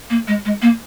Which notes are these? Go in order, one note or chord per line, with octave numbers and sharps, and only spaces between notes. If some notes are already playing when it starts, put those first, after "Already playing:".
A#3
G#3
G#3
A#3